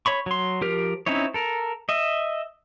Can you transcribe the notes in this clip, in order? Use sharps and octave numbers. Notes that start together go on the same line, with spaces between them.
C#5 B5 C#6
F#3 C6
F3 G4 A#4 F6
C4 C#4 D#4 E4 C#5
A4 A#4
D#5 E5